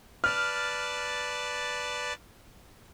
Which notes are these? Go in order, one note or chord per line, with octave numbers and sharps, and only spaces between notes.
B4 D5 A5 F6